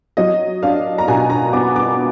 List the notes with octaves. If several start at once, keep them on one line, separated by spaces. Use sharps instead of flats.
F#3 D#5
D4 F5
A#5
B2 G#5
A#5
B3 D6
D6